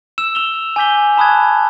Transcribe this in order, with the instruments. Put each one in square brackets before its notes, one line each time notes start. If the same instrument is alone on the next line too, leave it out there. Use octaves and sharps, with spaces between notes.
[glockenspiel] E6 E7
E6 F7 G7
G#5 D6 G6 B6 G7
A5 B5 D#6 F#6 G#6